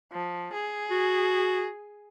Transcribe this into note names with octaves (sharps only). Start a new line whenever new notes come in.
F3
G#4
F#4